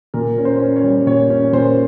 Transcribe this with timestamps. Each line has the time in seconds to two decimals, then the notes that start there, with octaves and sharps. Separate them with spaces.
0.14 A#2 A#4
0.38 C#4
0.45 C5
0.60 C#4
0.76 C#5
0.84 G3
1.06 A#2 C#5
1.30 C#4
1.53 A#2 C5